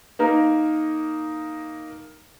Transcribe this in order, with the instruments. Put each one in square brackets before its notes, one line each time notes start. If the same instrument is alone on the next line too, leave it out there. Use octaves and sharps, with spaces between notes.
[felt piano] A#3 D#4 A#4